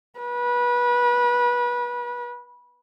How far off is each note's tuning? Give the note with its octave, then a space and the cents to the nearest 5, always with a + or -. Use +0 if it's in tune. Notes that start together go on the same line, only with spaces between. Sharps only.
B4 -25